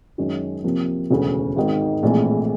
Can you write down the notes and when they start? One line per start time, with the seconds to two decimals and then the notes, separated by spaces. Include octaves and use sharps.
0.18 F#2 D#3 G#3 C#4 F#4
0.63 C3 F3 A#3
1.10 E1 D2 C#3
1.56 G#1 G#2 D#3
2.03 A#1 A2 E3 G#3 C4